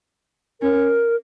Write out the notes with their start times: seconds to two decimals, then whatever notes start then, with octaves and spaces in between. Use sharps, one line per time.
0.61 C#4 A#4